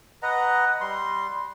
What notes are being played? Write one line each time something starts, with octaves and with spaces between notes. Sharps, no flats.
B4 D#5 F#5 A#5
G3 C6